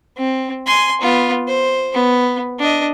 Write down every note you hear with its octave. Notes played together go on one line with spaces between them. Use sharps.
C4
G#5 C6
B3 F4
C5
B3
D4 D#5